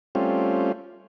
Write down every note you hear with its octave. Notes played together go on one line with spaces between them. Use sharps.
G3 A3 C4 C#4 F4